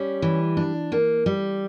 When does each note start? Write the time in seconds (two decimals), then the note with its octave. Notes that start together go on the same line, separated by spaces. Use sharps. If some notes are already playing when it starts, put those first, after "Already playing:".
Already playing: G3 C#4
0.22 E3
0.57 D4
0.92 A#3
1.26 G3